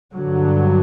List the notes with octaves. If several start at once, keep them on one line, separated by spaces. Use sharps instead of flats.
G2 D3 F#3